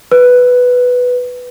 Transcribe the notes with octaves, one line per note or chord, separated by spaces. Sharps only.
B4